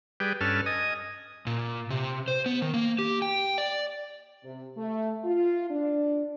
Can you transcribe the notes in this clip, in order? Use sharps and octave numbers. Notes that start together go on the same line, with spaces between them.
G3 G#4 B4 G5
G2 C#4 A4 B4 A5 F6
D#5 G#5 D#6
A#2
C3
C5
B3
D#3
A#3
G4
G5
D5
C3
A3
F4
D4